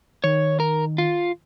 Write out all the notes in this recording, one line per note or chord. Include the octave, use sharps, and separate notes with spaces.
D#3 C#5
A#4
F4